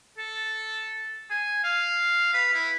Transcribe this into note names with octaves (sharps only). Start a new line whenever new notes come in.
A4
G#5
F5
B4
E4